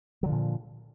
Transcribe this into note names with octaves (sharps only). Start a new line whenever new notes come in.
A#2 D3 F3 F#3